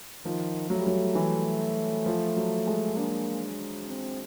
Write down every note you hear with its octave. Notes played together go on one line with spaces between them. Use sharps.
D#3 F3
F#3 A3
G3
F#3
E3
F3
F#3
G#3
A#3 D4
C4